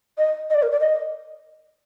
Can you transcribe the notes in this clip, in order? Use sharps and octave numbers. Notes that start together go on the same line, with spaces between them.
D#5
D#5
D5
A#4
D5
D#5